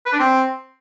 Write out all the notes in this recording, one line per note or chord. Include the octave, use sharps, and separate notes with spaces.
B4
D4
C4